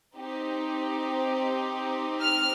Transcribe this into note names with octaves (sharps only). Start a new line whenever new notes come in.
C4 D#4 G4
F6